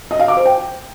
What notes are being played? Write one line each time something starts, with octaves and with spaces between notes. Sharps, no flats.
D#5
F5
D6
C5
G5